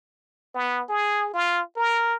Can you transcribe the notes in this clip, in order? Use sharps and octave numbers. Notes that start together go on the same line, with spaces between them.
B3
G#4
F4
A#4